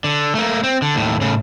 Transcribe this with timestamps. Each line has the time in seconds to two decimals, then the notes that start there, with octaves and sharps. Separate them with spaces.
0.04 D3
0.35 A3 A#3
0.64 C4
0.82 D3
0.95 D#2 A2
1.21 A2 C#3